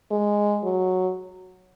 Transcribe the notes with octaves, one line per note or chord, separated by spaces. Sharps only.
G#3
F#3